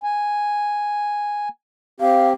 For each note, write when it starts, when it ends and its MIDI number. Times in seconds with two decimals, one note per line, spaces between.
0.03 1.49 80
2.00 2.33 60
2.00 2.33 67
2.00 2.28 77